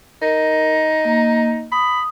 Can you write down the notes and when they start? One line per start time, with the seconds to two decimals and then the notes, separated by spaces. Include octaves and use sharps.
0.22 D#4 A#4
1.05 A#3
1.72 B5 D#6